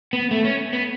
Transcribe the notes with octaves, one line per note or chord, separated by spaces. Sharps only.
B3
A3
C#4
B3